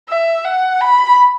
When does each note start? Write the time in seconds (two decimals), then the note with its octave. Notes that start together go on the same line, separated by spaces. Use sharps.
0.09 E5
0.45 F#5
0.81 B5